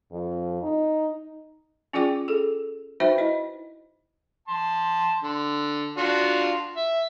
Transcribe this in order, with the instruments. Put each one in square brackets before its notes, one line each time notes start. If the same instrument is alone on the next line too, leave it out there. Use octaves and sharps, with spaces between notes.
[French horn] F2
D#4
[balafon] C#4 F4 G#4 D5 G5 D6
G#4 A4
D#4 F#4 B4 C5 E5 G5
E4 D#5
[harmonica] A5 C6
D3
D4 F4 F#4
E5